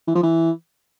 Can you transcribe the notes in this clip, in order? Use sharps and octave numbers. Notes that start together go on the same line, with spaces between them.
E3
F3
E3